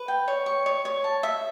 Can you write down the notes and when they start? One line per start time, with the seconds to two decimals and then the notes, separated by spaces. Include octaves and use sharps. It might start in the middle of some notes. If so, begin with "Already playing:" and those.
Already playing: B4
0.08 G5
0.28 C#5
0.46 C#6
0.66 C#5
0.85 C#5
1.04 A5
1.23 E5